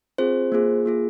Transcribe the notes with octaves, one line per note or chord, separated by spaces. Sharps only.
C4 F4 G#4 C5
A#3 F4 G#4
A#3 F4 G#4